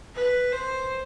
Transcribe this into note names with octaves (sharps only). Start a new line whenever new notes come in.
B4
C5